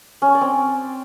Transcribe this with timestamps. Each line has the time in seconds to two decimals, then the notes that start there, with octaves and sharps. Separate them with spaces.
0.22 C#4
0.28 C#5
0.35 D5
0.41 C4